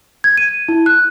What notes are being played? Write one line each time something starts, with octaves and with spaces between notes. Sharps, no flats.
G#6
D#7
E4
F#6